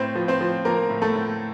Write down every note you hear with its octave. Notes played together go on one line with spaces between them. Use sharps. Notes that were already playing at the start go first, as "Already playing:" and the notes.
Already playing: A2 C4 C5
F3
C4 C5
F3
F3 A#3 A#4
A2
A3 A4
A2